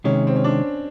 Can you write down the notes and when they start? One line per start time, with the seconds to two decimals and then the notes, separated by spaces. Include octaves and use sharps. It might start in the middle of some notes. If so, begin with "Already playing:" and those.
0.04 C3 D#3 G#3 C#4
0.27 C4
0.36 C#4
0.44 D4